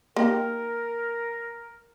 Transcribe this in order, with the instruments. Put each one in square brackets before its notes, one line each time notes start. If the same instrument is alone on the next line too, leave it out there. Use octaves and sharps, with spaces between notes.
[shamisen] A#3 D#4 G4 [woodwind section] A#4